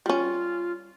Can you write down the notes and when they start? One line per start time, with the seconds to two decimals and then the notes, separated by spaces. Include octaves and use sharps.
0.06 G3 C#4 F4